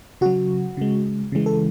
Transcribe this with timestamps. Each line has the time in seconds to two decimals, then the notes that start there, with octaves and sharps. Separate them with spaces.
0.21 C#3 F#3 F#4
0.77 C#3 G#3
1.32 C#3 E3 G#3
1.46 A4